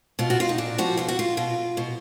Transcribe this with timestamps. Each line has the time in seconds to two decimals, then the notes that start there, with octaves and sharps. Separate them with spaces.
0.19 B2 F4
0.30 F#4
0.40 F4
0.49 D#4
0.58 A#2 D4
0.78 F3 F#4
0.97 B2 F4
1.08 F#4
1.19 F4
1.37 B2 F4
1.77 B2